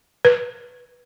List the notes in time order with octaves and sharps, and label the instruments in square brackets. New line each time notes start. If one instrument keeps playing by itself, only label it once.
[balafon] B4